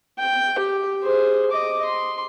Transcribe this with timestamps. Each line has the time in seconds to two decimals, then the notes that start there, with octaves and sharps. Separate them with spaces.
0.18 G5
0.58 G4
1.03 G#4 C5
1.51 D#5 D6
1.85 C6